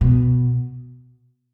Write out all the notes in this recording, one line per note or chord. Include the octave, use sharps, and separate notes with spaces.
B2